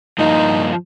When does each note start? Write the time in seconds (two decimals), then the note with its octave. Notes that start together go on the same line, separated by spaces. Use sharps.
0.18 G2 F3 A#3 D#4 F4